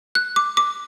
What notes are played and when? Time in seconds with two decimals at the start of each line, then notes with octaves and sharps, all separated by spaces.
0.15 F#6
0.36 D6
0.57 D6